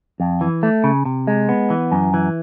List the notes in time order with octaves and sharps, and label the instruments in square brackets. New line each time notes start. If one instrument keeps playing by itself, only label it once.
[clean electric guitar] F2
E3
A3
C#3
C3
G#3
B3
E3
F#2
E3